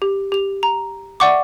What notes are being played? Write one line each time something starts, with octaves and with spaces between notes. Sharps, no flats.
G4
G4 F7
A#5
D5 E5 F#5 C#6 D6